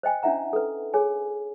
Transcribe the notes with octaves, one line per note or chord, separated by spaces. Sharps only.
C5 D#5 G5 G#5
C#4 D4 E4 E5 F#5 A#5
A4 B4
G#4 C#5 G#5